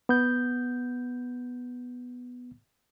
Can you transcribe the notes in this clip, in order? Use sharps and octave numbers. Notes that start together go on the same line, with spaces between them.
B3 G6